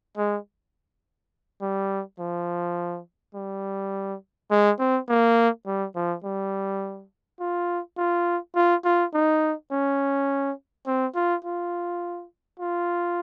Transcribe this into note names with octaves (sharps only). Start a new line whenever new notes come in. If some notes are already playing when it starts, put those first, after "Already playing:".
G#3
G3
F3
G3
G#3
C4
A#3
G3
F3
G3
F4
F4
F4
F4
D#4
C#4
C4
F4
F4
F4